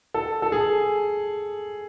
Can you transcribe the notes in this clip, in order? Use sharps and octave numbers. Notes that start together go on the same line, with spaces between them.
A4
A4
G#4